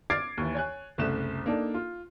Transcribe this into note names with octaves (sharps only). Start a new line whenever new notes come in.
D6 F6 G#6 A6 C7 D7
D#2 E3
C#5 G#5 F#6
F#1 C2 A3 F#6 E7
A#3 D4 D#4 A4
F4